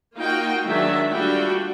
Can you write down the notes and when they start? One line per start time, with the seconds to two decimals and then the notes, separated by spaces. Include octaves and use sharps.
0.16 A#3 D#4 F4 F#4 G5
0.65 D#3 F#3 G#3 D4 E5
1.12 G3 A3 D4 F4 F#4 G5